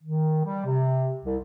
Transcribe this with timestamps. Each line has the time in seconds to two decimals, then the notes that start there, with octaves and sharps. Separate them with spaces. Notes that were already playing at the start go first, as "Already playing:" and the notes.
0.03 D#3
0.45 G3
0.65 C3
1.25 C2